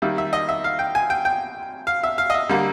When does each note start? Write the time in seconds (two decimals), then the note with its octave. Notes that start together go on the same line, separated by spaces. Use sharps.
0.02 D#3 G3 A#3 E5
0.18 E5
0.33 D#5
0.49 E5
0.64 F5
0.79 G5
0.95 G#5
1.10 G5
1.25 G5
1.87 F5
2.04 E5
2.18 F5
2.30 D#5
2.34 E5
2.49 D3 G3 A#3